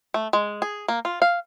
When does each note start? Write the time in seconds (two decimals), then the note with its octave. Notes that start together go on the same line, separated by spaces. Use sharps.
0.14 A3
0.33 G#3
0.62 G#4
0.88 A#3
1.05 F4
1.22 F5